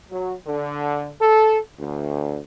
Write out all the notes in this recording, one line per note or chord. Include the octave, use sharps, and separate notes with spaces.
F#3
D3
A4
D2